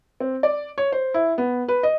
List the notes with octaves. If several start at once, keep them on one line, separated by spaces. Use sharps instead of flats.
C4
D5
C#5
C5
E4
B3
B4
D#5